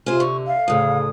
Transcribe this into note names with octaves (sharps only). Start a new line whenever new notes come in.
C3 F4 G#4 C5 G#5
D3 C#6
E5 F5
D2 A2 C#3 D#6